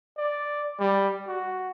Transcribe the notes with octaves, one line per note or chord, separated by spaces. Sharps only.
D5
G3
F#4